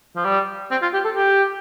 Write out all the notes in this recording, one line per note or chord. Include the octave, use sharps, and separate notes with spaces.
F3
G3
C4
F4
G4
A4
G4